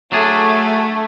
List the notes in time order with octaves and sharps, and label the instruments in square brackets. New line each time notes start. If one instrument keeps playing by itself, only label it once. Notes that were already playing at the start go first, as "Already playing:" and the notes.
[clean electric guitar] F#3 D4 G#4 [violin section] A3